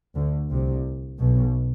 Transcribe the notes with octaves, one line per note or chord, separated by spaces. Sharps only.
D2 D3
C2 C3
B1 B2